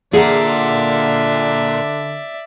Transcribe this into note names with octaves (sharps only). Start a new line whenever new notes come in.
A#2 D3 G#4 D5 E5 F#5 A#5